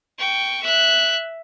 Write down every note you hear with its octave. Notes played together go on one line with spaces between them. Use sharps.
G5 C#6
E5 F#6